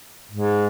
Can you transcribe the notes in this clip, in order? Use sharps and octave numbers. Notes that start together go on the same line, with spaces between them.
G#2